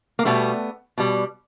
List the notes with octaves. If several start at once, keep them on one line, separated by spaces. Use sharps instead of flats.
A#3
B2 G3 A3 B3
B2 G3